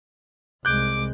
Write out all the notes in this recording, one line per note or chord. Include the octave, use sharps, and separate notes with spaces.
C2 G#3 D6 F#6 G6